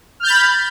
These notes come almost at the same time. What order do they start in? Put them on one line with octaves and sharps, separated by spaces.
F6 G6 A6 B5